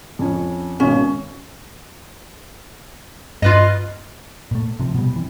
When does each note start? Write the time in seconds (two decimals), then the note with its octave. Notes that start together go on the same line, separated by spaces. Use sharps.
0.19 F2 C#4
0.80 G#1 B2 C#4
3.42 G2 F4 B4 D#5
4.51 A#2 A3
4.80 C3 F3
4.95 B2 G3
5.16 C3 E3